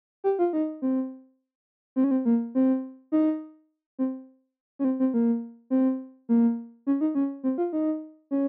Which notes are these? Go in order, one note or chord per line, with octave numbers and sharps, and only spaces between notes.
G4
F4
D#4
C4
C4
C#4
C4
A#3
C4
D#4
C4
C#4
C4
C4
A#3
C4
A#3
C#4
D#4
C#4
C4
F4
D#4
C#4